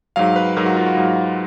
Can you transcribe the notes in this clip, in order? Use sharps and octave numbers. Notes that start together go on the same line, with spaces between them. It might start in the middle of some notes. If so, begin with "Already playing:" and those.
G#2 F#3 F5
B4
G#2 F#3 A#4
F#4
F4
F#4
G#2 F#3